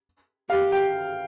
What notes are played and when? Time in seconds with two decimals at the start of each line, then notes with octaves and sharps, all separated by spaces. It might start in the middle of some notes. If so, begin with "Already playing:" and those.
0.50 G4 F5
0.72 G5